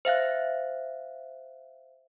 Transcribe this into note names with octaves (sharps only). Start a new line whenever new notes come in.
C5 E5 F5 F#6